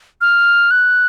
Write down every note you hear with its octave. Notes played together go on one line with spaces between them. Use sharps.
F6
F#6